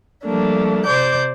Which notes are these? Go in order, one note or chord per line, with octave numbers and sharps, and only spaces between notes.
F3 G3 A3 A#3 D4
C3 C5 D5 D6 G6